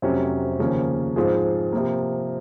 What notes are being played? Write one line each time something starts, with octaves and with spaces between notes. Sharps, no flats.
F1 F2 C3 F#3 C#4
D#2 C#3 F3 A#3 C#4
G#2 F3 C4 F4 G#4
C3 F3 A#3